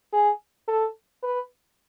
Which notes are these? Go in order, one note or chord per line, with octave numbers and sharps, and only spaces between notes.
G#4
A4
B4